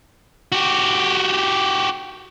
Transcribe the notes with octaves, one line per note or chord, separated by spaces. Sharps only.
F#4 G4